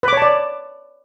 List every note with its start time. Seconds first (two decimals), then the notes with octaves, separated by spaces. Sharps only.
0.03 B4
0.08 D6
0.13 C#5
0.17 A5
0.22 D5